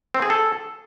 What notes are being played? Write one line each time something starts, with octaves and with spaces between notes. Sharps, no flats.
C4
G#4
A4